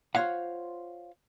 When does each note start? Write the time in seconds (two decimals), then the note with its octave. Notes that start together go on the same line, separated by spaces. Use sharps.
0.15 F4 C5 C#5 F5 F#5